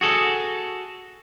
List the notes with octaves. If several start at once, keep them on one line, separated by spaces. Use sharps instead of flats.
F#4 G#4 A4